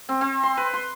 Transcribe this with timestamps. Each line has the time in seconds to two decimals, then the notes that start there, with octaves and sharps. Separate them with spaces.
0.09 C4
0.21 C4
0.43 C6
0.57 B4
0.74 C6